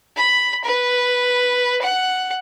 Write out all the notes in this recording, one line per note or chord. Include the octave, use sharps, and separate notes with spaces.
B5
B4
F#5